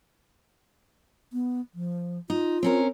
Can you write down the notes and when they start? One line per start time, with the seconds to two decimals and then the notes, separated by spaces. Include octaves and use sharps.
1.33 B3
1.75 F3
2.30 D#4 F4
2.63 C4 C#4 A#4